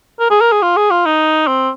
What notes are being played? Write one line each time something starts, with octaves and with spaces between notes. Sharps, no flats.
A#4
G#4
A#4
G#4
F4
G#4
F4
D#4
C4